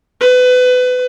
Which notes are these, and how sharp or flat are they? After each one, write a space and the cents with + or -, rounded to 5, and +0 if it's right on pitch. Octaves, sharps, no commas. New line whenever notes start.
B4 +25